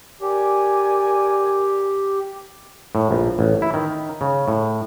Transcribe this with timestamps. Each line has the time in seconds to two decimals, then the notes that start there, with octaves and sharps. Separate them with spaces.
0.21 G4 A#4 D5 G#5
2.95 A2
3.11 A#1
3.39 A1
3.62 E4
3.74 D#3
4.21 C#3
4.48 A2